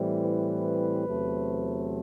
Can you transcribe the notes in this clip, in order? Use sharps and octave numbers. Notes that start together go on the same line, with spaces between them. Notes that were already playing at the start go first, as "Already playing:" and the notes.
Already playing: A2 E3 G3 C4
B4
E2 C3 F#3 A3 C4